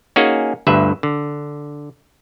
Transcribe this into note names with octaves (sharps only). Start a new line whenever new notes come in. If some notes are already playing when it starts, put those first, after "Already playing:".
A#3 C#4 D#4 F#4 G#4
G1 D2 G2 B4 E5
D3